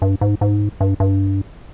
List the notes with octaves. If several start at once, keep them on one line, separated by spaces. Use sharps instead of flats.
G2
G#2
G#2
G2
G2